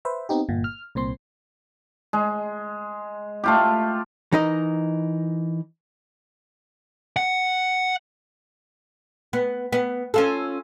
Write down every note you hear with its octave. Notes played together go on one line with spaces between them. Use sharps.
B4 C5 E5
B3 C4 D#4 G4
G1 A#2
F6
C2 A#2 C4 C6
G#3
A3 F4 G4
E3 D#4 A#4 D#5
F#5
B3
B3
C#4 F4 A4